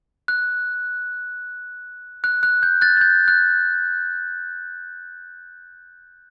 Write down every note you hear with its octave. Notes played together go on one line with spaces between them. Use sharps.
F#6
F#6
F#6
G6
F#6 A6
A6
G6
F#6